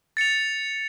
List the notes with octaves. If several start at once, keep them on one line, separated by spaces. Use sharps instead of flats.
A6 C#7 F7